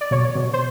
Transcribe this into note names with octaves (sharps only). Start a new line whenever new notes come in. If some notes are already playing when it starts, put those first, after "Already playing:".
D5
B2 C#5
B2
C5